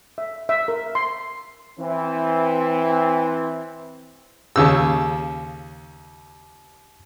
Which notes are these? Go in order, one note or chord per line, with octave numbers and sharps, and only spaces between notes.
E5
E5
A#4
C6
E3 C4
D#2 C#3 E6